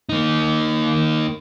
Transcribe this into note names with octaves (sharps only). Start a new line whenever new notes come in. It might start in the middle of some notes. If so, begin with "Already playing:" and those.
A#3 D#4